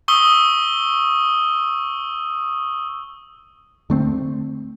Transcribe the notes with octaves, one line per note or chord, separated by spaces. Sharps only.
C#6 D#6 E6 G7
D3 A3 C4